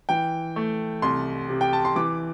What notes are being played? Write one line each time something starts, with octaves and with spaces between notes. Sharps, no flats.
E3 G5
A3
C2 C6
C3
G5
A5
C6
E3 D6